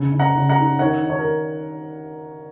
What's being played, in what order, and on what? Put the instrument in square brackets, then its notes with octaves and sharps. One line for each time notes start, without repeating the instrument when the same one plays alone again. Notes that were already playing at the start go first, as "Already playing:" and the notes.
Already playing: [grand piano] C#3
C#3
F#5 A#5
C#3
F#5 A#5
D#4
D#3 C#5 F#5
D#3
C#5
A#4